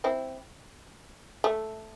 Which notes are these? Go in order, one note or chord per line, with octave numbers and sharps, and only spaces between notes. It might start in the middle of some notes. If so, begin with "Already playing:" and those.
C4 E4
A3